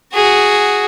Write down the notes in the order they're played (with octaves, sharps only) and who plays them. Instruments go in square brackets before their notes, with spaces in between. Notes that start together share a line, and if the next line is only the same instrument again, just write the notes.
[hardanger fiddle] F#4 G#4